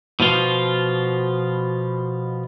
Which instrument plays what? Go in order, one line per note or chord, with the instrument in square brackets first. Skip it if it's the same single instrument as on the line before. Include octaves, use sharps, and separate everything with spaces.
[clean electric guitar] B2 F3 F4